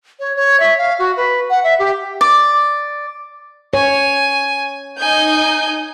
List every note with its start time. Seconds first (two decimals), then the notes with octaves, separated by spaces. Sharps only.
0.20 C#5
0.36 C#5
0.60 E5
0.78 F5
0.99 F#4
1.17 B4
1.50 F#5
1.64 E5
1.79 G4
2.21 D5
3.74 C#5 G#5
4.99 D#4 G#5 D#6 G6